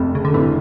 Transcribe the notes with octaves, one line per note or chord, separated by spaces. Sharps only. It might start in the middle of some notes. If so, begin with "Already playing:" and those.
Already playing: F1 F2
C#3
D3
F1 E3